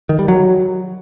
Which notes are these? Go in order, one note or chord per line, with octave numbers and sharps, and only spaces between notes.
D#3
G3
F#3